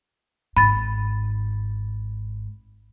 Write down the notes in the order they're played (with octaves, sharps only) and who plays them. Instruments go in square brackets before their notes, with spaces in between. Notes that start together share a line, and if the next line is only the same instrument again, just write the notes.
[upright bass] G#1 G#2 [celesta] B5 A6